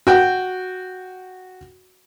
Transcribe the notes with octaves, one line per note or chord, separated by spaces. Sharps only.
F#4 G5